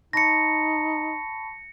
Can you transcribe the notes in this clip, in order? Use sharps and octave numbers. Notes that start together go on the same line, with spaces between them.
D#4 A5 B5 C#6 A#6 C#7